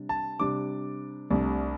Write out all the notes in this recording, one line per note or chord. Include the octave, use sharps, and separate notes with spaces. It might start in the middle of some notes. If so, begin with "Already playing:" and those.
Already playing: C3 G3 D4
A5
C3 G3 D4 D6
C2 C3 A3 D4